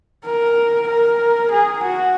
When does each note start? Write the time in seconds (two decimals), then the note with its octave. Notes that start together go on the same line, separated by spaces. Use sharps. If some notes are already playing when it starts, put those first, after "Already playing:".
0.25 A#4
0.88 A#4
1.51 G#4
1.83 F#4